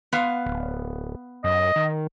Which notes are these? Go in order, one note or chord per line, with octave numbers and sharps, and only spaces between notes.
B3 F5
D1
F#2 D#5
D#3